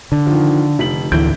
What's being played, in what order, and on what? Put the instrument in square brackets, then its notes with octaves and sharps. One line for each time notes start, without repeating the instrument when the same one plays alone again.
[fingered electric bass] D3
[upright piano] D#3 F3
F1 B6 F#7
[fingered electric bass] D2 D3 E3 [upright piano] A2 G6 D7